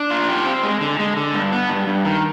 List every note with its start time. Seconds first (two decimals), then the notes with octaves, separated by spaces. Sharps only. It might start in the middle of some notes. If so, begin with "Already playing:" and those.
Already playing: D4
0.10 F4
0.29 G4
0.45 C4
0.63 G#3
0.81 D3
0.99 G#3
1.17 D3
1.34 G2
1.52 B3
1.70 G2
1.87 G2
2.05 D#3